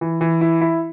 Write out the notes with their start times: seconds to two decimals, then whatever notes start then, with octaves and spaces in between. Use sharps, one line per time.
0.01 E3
0.21 E3
0.41 E4
0.61 E4